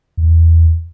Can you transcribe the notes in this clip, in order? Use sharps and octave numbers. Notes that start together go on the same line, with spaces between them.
E2